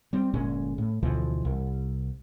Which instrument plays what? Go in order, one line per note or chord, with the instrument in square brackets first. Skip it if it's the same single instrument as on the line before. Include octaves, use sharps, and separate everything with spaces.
[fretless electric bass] G3 C4
G1 A#2 G#3 C#4
A2
D2 B2 E3 F3
C2